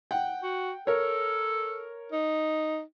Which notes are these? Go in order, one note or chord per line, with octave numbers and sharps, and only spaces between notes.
F#5 G5
F#4
A4 A#4 C#5
D#4